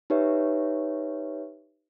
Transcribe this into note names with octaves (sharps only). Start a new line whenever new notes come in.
D#4 G4 B4 C#5 E5